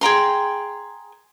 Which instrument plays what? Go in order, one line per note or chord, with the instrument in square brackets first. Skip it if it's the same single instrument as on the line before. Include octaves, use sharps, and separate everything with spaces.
[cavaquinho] G#4 G5 A#5 C6